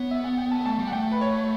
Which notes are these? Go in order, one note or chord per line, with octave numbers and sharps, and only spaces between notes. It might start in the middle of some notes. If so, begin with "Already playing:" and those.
Already playing: B3 C#5
E5
F#5
G5
A5
A3 A5
G3
F#5
A3 G5
B4
C#5